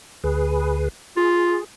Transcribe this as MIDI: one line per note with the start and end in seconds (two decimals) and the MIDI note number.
0.24 0.89 38
0.24 0.89 68
0.24 0.89 71
1.17 1.57 65
1.17 1.64 68